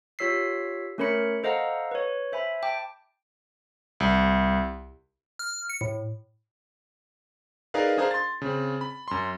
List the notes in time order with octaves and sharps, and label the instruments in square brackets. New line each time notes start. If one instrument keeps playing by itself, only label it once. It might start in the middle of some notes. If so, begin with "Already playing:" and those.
[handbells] F4 G4 C#5 E6 B6 C7
A3 C#4 A#4 C#5 B5 C#7
A4 C5 D#5 F5 F#5 A#5
B4 C#5
C5 E5 G#5 B5
G5 A5 D6
[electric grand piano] C2
[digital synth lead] F6
C#7
A2
[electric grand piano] D#4 G#4 A#4 B4 D5 F5
D4 G#4 C5 F5 A#5
C6 A6
C#3 C4
B5
F#2 C6